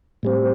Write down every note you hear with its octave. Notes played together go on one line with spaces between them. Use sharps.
A2 G3 C4